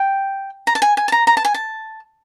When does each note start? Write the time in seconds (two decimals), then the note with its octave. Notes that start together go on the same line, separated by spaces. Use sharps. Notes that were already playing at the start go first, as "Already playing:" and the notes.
Already playing: G5
0.67 A#5
0.75 A5
0.82 G#5
0.97 G#5
1.08 A5
1.12 A#5
1.27 A#5
1.37 A5
1.45 G#5
1.54 A5